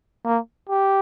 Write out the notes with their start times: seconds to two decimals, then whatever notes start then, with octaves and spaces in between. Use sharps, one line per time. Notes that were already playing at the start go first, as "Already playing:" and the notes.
0.25 A#3
0.70 G4